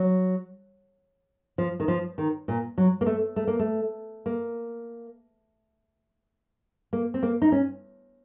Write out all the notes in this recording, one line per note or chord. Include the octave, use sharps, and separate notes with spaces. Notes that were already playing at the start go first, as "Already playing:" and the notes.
Already playing: F#3
F3
D#3
F3
D#3
A#2
F#3
A#3
A3
A3
A#3
A3
A#3
A#3
C4
A#3
D#4
C#4